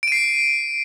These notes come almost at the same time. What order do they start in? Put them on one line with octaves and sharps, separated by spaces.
D7 D#7 C7